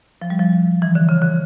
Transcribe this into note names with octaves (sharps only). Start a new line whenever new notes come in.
F3
G3
F3
E3
D3
C#3
D3